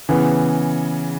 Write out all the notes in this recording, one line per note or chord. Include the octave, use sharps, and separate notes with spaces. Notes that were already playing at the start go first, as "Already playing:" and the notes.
C#3 E3 B3